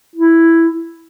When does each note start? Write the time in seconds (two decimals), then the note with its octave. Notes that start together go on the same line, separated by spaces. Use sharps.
0.16 E4